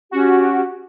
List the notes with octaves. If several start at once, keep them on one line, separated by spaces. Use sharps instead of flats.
C#4 F#4 G4